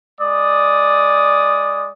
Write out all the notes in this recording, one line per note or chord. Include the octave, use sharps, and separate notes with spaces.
G#3 D5 D#6